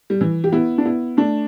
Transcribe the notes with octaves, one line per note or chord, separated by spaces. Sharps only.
G3
E3
G4
B3 E4
D4
B3 E4
A3 D4